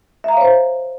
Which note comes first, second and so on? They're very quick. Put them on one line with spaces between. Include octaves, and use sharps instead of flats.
E5 A#5 F5 C#5 C5